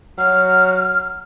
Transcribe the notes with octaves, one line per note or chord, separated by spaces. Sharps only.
F#3 F6